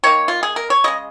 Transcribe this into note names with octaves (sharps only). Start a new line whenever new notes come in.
D#3 A#3 C#5
F4
G#4
A#4
C#5
C#3 G#3 D#5